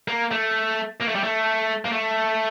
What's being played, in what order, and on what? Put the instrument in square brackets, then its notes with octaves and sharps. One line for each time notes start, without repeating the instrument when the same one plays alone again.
[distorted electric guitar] A#3
A3
A#3
A3
G3
A3
A#3
A3